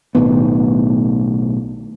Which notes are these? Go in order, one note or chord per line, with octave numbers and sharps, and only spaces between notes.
B1 A2 D#3 B3